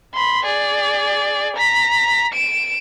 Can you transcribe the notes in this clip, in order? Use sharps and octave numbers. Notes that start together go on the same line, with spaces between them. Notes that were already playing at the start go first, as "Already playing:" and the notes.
B5 C6
G#4 D5
A#5 B6
D7 E7